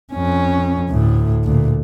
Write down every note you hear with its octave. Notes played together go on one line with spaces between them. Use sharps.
F2 C#4
D2 A2
D2 A#2